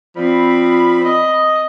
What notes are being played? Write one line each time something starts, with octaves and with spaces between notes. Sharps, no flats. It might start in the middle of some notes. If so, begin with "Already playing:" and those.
F3 C4 D5 B5
D#5